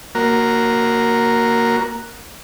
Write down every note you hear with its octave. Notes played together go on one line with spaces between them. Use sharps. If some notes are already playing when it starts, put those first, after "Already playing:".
A#3 F#4 A#4